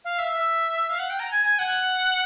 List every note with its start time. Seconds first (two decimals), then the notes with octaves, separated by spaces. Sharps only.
0.05 F5
0.18 E5
0.33 E5
0.89 F5
0.99 F#5
1.10 G5
1.20 A#5
1.31 G#5
1.45 G#5
1.59 F#5